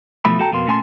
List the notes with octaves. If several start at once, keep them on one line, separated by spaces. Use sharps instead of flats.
B2 E3 F3 A3 E5 B5
F#4 A4 G5 A5 A#5
F2 B2 A#3 C6
A#2 A3 C#4 G#5 A5 C6